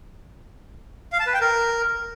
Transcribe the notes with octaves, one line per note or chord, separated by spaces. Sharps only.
F5
A5
B4
G5
A#4